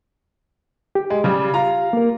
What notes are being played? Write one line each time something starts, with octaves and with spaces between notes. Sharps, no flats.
G4
G#3
C#3 G3
F4 A#5
A#3 A#4